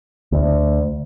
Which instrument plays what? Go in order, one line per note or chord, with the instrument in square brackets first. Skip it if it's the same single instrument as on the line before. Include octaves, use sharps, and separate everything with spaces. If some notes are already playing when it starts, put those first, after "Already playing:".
[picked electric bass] D2